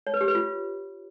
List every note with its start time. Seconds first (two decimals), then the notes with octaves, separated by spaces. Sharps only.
0.07 C#5
0.14 B4
0.21 G4
0.28 B4
0.35 F4